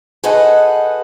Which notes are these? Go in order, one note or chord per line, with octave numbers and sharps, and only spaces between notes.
G#4 A4 B4 C5 D#5 F#5